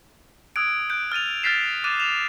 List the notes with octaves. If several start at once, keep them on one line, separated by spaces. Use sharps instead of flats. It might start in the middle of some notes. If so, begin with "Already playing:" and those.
D#6 E6 F#6 G#6 D7
F#6 G6 D7
F6 A6 D#7 F7
F6 G6 A6 B6 C7 E7
D6 F#6 A6 D#7 E7
E7 F7